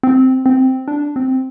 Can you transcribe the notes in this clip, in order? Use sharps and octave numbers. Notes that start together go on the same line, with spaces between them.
C4
C4
D4
C4